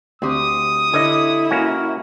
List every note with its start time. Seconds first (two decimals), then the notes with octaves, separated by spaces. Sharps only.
0.22 D2 C4 G4 D#6
0.94 D3 E4 C#5 D#5
1.51 A#3 C#4 F#4